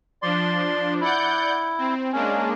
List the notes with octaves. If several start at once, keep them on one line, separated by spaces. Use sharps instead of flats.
F3 D4 D5 C6
E4 D5 F#5 G6
C4
G#3 A#3 C#4 D4